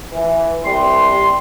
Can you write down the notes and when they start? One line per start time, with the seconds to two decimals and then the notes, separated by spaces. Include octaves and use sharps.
0.12 E3
0.64 C2 G3 C6